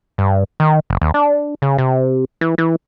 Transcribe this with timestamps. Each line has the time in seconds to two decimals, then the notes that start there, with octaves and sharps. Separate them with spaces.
0.18 G2
0.60 D#3
0.90 F#1
1.01 D#2
1.14 D4
1.62 C#3
1.78 C3
2.41 E3
2.58 E3